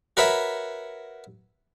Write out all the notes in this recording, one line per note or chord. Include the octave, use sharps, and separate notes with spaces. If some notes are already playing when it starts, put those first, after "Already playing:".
F#4 A#4 B4 C#5 E5